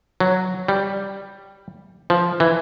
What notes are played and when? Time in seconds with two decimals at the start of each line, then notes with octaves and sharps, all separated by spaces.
0.20 F#3
0.68 G3
2.10 F3
2.40 E3